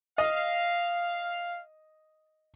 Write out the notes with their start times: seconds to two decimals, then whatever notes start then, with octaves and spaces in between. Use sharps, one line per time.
0.18 D#5 F5